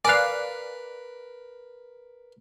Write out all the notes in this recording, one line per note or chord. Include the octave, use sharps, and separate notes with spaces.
A#4 B4 D5 F5 G#5 F#6